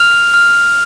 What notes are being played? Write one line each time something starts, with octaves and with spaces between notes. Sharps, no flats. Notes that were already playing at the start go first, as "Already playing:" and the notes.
Already playing: F6 F7
F6